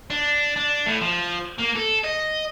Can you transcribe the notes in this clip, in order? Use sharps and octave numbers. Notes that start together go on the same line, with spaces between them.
D4
D4
A2
F3
A#3
A4
D#5